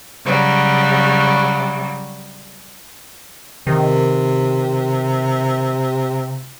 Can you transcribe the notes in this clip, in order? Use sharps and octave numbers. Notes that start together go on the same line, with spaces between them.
C#3 F#3 G3
C3 D#3